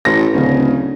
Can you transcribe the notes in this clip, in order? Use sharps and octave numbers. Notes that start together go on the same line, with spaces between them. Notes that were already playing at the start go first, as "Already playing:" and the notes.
A1 A#6
D1 C#3 C#4